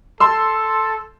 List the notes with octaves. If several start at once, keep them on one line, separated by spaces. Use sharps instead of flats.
A4 A5 C6 E6